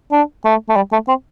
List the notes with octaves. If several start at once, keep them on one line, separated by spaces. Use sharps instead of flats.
D4
A3
A3
G3
A3
C4